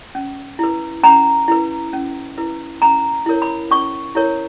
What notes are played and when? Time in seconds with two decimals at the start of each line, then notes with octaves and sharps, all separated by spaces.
0.15 C#4
0.59 E4 B4
1.04 C#4 A#5
1.48 E4 B4
1.93 C#4
2.38 E4 B4
2.82 C#4 A#5
3.26 E4 A#4 C#5
3.42 B5
3.71 C#4 C#6
4.15 E4 A#4 C#5